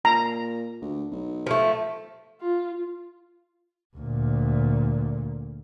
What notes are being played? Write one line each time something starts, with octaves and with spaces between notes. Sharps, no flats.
A#2 A#5
D2
B1
F3 A3
F4
D2 A#2